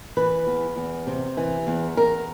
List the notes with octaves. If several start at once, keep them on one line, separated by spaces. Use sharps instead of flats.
E3 B4
E2
E2
C3
E3
E2
E2 A#4